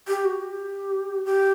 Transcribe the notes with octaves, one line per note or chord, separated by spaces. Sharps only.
G4
F#4
G4
G4